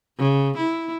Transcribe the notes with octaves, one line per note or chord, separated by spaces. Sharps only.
C#3
E4